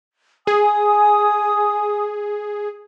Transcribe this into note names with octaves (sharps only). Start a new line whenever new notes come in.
G#4 G#5 D#6